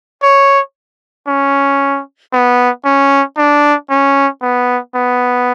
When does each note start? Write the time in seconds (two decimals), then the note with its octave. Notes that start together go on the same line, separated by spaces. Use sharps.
0.23 C#5
1.27 C#4
2.33 B3
2.85 C#4
3.37 D4
3.90 C#4
4.41 B3
4.95 B3